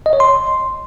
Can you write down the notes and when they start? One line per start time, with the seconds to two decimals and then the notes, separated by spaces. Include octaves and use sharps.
0.06 D#5
0.13 C#5
0.20 C6